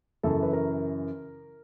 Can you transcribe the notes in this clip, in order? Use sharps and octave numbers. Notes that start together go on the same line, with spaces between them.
F#2 C#3 E3 A4
B4
A#4